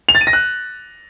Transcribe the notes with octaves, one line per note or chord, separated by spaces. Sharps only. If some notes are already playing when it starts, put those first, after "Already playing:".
F7
A6
D#7
A#6
F#6